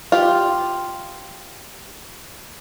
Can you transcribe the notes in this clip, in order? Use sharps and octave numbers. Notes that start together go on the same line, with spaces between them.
F4 G4